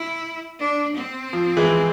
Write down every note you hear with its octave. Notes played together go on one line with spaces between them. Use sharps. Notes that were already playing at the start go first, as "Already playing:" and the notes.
Already playing: E4
D4
C4
F3
E3 G#3